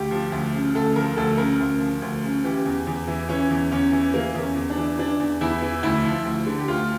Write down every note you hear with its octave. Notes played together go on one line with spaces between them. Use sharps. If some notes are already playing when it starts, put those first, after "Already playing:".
Already playing: D2 G4
F3
D2
C#3
D2 A4
F3 A#4
D2 A4
C#3 A#4
D2
F3
D2
C#3
E3 G4
E2
E2
E3
E3 C#4
E2
E2 C#4
E3
E3 A#3
E2
C#4
E2
D4
E3
E3 D4
E2
E2 E4
E3
D2 E4
F3
D2
D3
G4
D2 F4